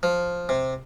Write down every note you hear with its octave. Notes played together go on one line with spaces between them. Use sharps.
F3
C3